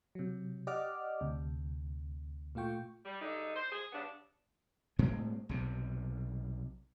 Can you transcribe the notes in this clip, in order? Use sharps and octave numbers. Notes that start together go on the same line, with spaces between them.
C3 F#3
G4 D5 D#5 F#5 D6 F6
D2 C3
A#2 A3 F4 G5 C#6
G3
G2 D3 G#3 D#4
C5
G#4
G2 C#3 B3 D4
A2 G#3 C4
B1 C3